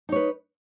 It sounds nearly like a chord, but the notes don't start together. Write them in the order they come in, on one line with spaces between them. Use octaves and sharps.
D#4 C#5 B4